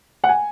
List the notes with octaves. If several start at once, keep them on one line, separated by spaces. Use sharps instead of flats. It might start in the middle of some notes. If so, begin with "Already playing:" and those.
F#5
G#5